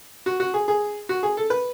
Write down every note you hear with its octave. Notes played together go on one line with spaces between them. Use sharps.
F#4
F#4
G#4
G#4
F#4
G#4
A4
B4